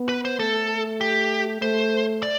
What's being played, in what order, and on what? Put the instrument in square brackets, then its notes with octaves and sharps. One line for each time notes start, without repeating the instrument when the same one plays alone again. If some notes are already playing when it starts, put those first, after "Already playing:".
Already playing: [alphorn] B3
[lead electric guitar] B4
C5
[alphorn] A3 [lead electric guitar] A4
[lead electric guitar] G4
[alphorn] A3 [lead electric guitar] C5
[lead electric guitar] D5